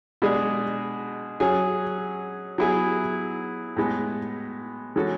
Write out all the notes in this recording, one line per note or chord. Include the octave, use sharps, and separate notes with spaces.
B2 G#3 D4 G#4
F#3 C#4 G#4
F#3 B3 E4 G#4
A2 G#3 B3
E3 G#3 C#4 F#4 A4